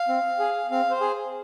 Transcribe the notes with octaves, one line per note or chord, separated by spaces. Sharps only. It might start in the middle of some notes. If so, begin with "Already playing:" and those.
Already playing: F5
C4
G#4
C4 F5
C5
G#4